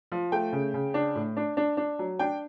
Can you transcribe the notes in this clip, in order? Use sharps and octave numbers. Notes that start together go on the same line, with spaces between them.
F3
A3 G5
C#3
C#3
D4
A2
D4
D4
D4
F#3
D4 G5